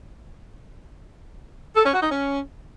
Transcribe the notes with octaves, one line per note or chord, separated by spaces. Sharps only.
A4
C#4
F#4
D#4
C#4